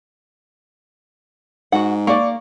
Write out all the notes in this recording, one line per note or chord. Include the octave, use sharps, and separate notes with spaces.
G#2 F#4 F#5
A#3 D5 C#6